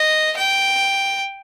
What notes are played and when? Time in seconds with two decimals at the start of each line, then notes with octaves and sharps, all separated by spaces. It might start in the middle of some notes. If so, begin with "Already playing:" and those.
Already playing: D#5
0.36 G5